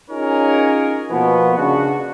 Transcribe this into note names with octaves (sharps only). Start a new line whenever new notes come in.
C#4 D#4 F4 G#4 A#4 C#5
B2 F3 A#3 B3
C#3 D4 F#4